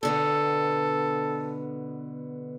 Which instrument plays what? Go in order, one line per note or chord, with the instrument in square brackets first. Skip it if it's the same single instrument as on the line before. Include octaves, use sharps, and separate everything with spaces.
[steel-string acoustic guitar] B2 D3 B3 [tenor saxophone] A4